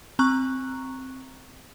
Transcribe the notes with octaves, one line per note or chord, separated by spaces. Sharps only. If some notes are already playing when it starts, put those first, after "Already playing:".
C4 A#5 C#6 F#6